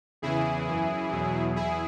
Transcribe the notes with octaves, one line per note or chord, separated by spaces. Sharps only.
E2 C#3 E3 E4 G#4
F#2 E3
E2 B2 F#3
E2 E4 G#4